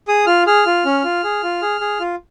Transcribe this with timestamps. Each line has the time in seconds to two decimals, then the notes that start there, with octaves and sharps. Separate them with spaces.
0.08 G#4 D#6
0.27 F4 F6
0.47 G#4 F6
0.66 F4
0.85 C#4
1.04 F4
1.24 G#4
1.43 F4
1.62 G#4
1.81 G#4
2.00 F4